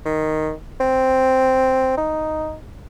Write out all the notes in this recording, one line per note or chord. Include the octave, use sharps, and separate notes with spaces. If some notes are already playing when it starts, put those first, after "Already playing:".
D#3
C4
D#4